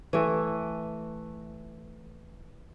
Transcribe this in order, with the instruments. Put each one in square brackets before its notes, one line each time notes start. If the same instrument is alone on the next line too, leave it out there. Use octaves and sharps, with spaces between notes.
[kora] E3 A3